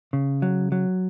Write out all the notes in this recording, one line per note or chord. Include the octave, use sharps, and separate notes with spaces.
C#3
F#3
F#3